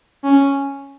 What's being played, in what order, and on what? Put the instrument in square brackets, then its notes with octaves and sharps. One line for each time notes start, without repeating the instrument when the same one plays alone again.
[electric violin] C#4